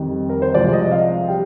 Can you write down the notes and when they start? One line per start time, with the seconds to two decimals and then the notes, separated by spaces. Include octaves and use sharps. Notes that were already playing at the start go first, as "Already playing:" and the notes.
Already playing: F2 D#3 G3
0.29 A#4
0.42 C5
0.54 C2 C3 F3 G#3 D5
0.73 D#5
0.91 F5
1.28 G3 G5